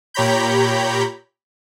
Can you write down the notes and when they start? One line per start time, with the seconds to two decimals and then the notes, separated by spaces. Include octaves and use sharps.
0.14 A#2 G4 C#5 A#5 B5 G6